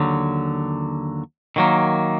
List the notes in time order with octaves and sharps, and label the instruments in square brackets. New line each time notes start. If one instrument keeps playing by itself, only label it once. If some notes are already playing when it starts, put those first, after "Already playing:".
Already playing: [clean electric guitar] D#2 D3 F#3
D#3 F#3 A#3